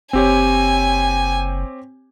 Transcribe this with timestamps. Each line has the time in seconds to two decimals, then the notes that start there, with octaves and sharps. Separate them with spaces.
0.13 F#1 C4 G4 C#5 G#5